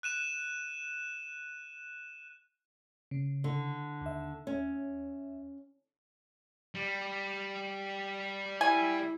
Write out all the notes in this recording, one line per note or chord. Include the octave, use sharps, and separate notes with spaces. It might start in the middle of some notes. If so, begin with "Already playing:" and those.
F#6 D#7 E7
C#3
D3
D#2 E5
C#4
G3
E4 G#5